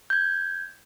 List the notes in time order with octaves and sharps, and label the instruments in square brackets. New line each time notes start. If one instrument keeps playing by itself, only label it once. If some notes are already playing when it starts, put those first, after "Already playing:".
[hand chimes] G6 G#6